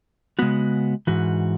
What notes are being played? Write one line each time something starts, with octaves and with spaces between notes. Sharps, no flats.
C#3 G#3 B3 F#4
G#2 E3 F#4